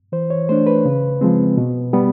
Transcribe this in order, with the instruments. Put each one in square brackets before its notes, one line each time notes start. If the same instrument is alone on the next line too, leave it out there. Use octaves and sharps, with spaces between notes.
[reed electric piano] E3 C5
C#5
A3 D4 C5
B4
C#3
F3 G#3 C4
B2
G3 B3